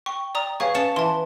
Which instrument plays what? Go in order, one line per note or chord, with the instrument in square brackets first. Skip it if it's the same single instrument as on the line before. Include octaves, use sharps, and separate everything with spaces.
[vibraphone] G5 [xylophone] C#6
[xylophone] D5 A#5 D#6
[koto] G#4 [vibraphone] B4 [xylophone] C#5 F5 C#6
[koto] C#4 C#5 A5 [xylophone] C#7 E7
[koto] E3 [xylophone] A5 C6